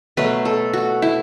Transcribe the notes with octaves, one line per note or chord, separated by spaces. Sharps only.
B2 F#3 A3 B4
A4
F#4
E4